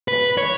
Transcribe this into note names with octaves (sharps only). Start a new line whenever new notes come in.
B4
C#5